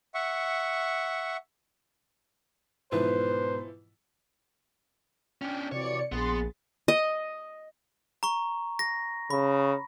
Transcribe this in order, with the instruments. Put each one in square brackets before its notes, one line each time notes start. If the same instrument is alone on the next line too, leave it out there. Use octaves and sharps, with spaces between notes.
[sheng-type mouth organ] E5 F#5 C#6
[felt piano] G#2 B2 [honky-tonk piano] E3 F3 E4 [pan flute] B4 [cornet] C5
[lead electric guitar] C#4 D4 [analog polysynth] G5
[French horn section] F2 E3 F#3 [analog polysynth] C3 D5 C#7 [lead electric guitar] C#5
[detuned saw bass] A#1 [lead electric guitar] B3 [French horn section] G#4 [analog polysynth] C6 A6
[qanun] D#5
[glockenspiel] A#5 C#6
A#6
[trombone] C#3 [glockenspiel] B5